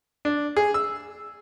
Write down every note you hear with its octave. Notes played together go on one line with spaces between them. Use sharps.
D4
G#4
E6